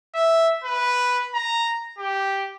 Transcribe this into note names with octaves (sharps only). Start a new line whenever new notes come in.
E5
B4
A#5
G4